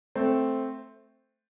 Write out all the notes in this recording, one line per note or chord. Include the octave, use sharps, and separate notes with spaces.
A3 C4